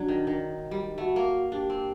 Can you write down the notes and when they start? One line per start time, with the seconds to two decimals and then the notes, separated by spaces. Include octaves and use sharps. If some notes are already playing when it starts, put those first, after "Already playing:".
Already playing: F#3 D4
0.08 D#3
0.27 D#3
0.45 D#4
0.71 G3
0.97 A3 F#4
1.16 A#3
1.52 D4 G4
1.70 C4